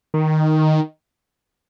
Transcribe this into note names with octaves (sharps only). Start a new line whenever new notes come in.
D#3